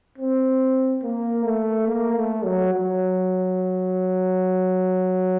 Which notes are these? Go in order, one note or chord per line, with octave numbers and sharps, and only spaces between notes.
C4
A#3
A3
A#3
A3
F#3
F#3